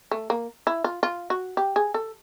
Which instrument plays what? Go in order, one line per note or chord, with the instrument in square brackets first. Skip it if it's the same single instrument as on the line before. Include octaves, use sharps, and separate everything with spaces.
[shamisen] A3
A#3
E4
F4
F4
F#4
G4
G#4
A4